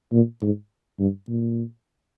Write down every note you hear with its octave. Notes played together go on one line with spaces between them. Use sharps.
A#2
G#2
G2
A#2